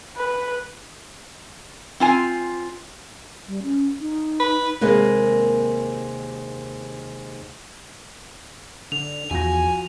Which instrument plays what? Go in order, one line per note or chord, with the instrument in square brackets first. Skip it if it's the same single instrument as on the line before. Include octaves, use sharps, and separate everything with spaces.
[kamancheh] B4
[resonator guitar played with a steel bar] C4 F4 G#5
[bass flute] G3
C#4
D#4
[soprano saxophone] B4
[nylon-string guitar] D#2 C3 G#3 A#3 B4
[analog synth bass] D3 [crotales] F7
[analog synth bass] E2 [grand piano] F3 F#4 A#6 [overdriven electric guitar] G#5